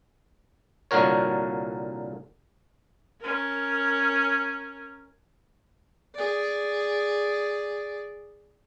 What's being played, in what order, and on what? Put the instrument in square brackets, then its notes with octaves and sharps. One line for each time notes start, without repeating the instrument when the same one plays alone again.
[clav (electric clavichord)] C2 A#2 D3 F#4 A#4 C#5
[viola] C#4 A#4
[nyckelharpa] G#4 D5